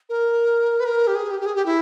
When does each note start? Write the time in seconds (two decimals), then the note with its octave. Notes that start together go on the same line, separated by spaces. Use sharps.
0.09 A#4
0.80 B4
0.85 A#4
1.07 G4
1.15 G#4
1.31 G4
1.41 G4
1.46 G#4
1.56 G4
1.66 E4